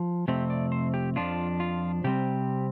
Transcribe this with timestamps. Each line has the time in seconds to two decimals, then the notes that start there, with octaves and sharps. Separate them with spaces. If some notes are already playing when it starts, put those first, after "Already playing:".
Already playing: F3
0.28 F2 C3 A3 C4 G4
0.50 D5
0.72 C5
0.94 G4
1.16 F2 F3 D4 F4
1.60 F4
2.04 C3 G3 C4 G4